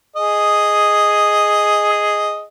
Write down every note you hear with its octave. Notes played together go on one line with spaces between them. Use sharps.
G#4 D#5